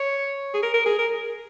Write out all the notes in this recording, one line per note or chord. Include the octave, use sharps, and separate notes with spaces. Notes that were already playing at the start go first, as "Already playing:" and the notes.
Already playing: C#5
G#4
A#4
A#4
G#4
A#4